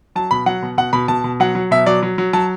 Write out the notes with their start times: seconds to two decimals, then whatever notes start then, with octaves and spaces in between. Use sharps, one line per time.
0.16 F#3 A5
0.31 B2 B5
0.46 F#3 F#5
0.63 B2
0.78 B2 F#5
0.93 B2 B5
1.08 B2 A5
1.24 B2
1.40 F#3 F#5
1.55 F#3
1.71 B2 E5
1.86 F#3 D5
2.03 F#3
2.18 F#3
2.33 F#3 A5